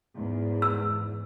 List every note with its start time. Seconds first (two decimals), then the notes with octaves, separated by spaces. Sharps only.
0.15 E2 G#2
0.62 E6